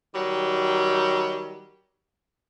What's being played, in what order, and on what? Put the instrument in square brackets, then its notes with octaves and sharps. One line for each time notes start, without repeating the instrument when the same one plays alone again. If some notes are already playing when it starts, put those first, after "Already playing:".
[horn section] D#3 F#3 G3